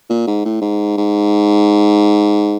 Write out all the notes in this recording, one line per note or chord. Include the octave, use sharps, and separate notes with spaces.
A#2
G#2
A2
G#2
G#2